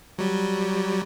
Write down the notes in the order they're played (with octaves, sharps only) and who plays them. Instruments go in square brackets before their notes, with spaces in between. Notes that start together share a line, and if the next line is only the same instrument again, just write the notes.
[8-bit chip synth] F#3 G3